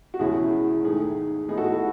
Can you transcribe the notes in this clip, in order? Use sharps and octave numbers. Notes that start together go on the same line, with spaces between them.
F#4
E2 B2 G#3 C#4 E4 G#4
G#2 D#3 A3 G#4
A2 G#3 B3 D#4 G#4
F#4 A4
F#4